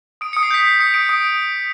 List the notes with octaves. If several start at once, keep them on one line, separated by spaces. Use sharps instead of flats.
D#6 D7
D#6 C#7
C7
G6 B6
G6 C7
D#6 C#7
D#6 D7
D#6 D7